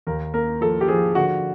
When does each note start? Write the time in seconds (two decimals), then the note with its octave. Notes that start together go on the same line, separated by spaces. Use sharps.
0.07 D#2 A#4
0.34 A#3 A#4
0.61 F3 A4
0.81 G4
0.88 F3 G#4
1.15 D3 F#4